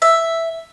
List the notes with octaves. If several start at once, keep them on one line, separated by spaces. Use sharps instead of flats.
E5